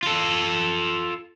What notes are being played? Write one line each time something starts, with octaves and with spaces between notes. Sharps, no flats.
F4 A4